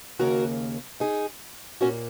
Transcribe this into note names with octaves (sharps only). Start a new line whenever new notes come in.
D#2 C#3 A#3 F#4 A#4
D#4 G#4
A#2 A#3 C#4 F#4